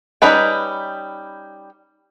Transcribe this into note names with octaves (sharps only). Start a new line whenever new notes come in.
G3 C#4 D#4 B4 G5